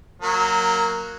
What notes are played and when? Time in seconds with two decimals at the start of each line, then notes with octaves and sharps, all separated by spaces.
0.21 F#3 A#3